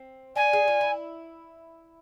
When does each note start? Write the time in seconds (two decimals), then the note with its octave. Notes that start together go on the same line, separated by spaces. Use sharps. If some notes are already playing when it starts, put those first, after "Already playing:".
Already playing: C4
0.35 D4 G#5
0.53 G#4
0.68 F4
0.81 E4